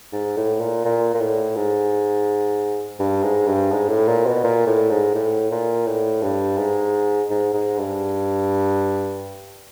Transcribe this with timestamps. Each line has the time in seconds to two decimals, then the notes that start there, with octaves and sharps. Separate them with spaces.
0.12 G#2
0.37 A2
0.60 A#2
0.85 A#2
1.14 A#2
1.20 A2
1.56 G#2
2.99 G2
3.23 G#2
3.47 G2
3.71 G#2
3.89 A2
4.08 A#2
4.26 B2
4.43 A#2
4.66 A2
4.90 G#2
5.14 A2
5.51 A#2
5.87 A2
6.22 G2
6.58 G#2
7.30 G#2
7.53 G#2
7.78 G2